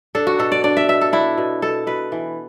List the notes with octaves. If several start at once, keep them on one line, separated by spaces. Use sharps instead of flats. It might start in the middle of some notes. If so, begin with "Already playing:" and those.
D4 A4
F#4
B2 A4
D5
D4 D5
E5
B2 E5
A4
D4 E4
B2
B2 A4
B2 B4
E3